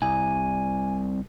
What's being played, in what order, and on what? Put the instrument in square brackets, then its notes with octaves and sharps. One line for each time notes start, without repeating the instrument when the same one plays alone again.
[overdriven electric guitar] C2 [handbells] G#5